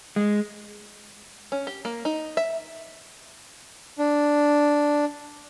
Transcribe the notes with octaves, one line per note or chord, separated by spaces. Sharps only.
G#3
C#4
G4
A#3
D#4
E5
D4